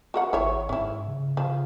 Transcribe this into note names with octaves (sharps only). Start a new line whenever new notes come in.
F#4 A#4 F#5
G#1 E4 C#5
G#2 C#4 E4
C#3
C#3 F3